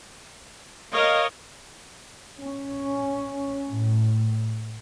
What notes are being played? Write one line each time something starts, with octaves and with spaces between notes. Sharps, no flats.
A#4 C#5 D#5 F5
C#4
A2